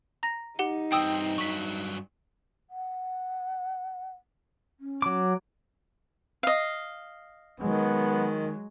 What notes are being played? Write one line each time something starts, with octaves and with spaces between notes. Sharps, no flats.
A#5 A#6
D#4 G4 F#5 G7
G2 C4 G5 D#6 E6
G2 F#3 C#6 B6
F#5
C#4
F#3 D6
D#5 F5
D#3 F#3 G#3 B3